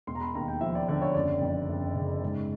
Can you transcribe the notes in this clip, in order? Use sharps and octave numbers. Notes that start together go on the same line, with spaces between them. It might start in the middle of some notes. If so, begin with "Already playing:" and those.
E1 C6
A#5
B5
D#2 A#5
G5
F3 E5
D5
D3 D5
C#5
F#1 D5
F2
F#1
C#3
G#2